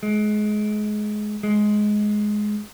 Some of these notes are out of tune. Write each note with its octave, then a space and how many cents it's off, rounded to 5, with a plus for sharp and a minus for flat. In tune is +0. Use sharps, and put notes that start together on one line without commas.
G#3 +25
G#3 +10